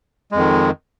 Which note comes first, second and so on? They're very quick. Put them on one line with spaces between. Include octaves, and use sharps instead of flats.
G#3 F2 D#3